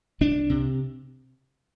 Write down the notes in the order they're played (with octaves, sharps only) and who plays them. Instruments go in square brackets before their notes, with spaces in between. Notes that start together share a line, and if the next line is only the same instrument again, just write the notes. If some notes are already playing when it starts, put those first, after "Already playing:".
[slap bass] C2 D4
C3